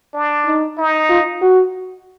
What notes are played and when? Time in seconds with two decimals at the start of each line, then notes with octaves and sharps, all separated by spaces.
0.14 D4
0.46 D#4
0.78 D#4
1.10 F4
1.41 F#4